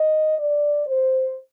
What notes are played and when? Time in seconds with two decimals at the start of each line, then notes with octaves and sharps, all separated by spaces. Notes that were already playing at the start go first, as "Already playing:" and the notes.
Already playing: D#5
0.39 D5
0.87 C5